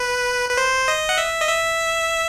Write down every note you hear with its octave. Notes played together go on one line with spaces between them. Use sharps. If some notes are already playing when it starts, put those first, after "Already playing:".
Already playing: B4
B4
C5
D#5
F#5
E5
D#5
E5